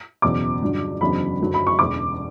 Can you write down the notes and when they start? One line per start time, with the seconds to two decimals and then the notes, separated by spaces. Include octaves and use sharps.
0.22 F#1 E2 B2 D6
0.61 G1 G2 F#3
1.01 F#1 E2 D3 F#3 B5
1.40 F#1 F#2 D3 F#3
1.54 B5
1.67 C#6
1.79 E1 E2 D3 D6